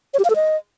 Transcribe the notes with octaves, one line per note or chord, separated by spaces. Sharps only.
C#5
G4
F5
A4
D#5